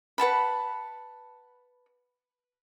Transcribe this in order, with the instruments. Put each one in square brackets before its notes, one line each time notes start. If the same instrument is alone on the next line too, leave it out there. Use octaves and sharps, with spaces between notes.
[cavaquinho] B4 F#5 A5 B5